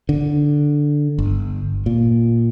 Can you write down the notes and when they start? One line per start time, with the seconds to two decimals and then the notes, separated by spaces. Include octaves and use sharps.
0.09 D3
1.19 G1
1.86 A#2